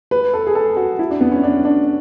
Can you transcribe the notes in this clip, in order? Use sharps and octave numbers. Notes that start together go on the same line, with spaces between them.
B4
A4
G#4
A4
F#4
E4
D4
B3
C#4
D4
D4